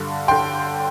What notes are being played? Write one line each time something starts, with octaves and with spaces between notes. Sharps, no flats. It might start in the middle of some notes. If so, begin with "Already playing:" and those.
Already playing: G2 D3
D3 G5 C6